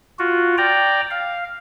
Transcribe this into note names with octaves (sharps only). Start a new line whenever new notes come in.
F4 F#4
D5 G5 A#5
F5